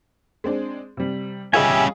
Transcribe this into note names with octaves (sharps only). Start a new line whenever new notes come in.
G#3 C4 D4
C3 G3
G3 C#4 F4 G4 G#4 D#5 E5 G#5